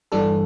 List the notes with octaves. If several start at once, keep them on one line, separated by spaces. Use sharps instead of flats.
G2 E3 G3 D4 A4